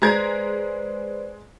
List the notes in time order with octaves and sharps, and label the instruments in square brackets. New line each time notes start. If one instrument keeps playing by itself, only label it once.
[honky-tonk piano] G#3 A#5 G#6 [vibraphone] B4 C5 D5